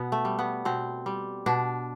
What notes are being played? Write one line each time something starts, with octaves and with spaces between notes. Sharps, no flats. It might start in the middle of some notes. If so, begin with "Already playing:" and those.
Already playing: B2 B3
A3
G3
B3
B2 C4
G3
B2 D4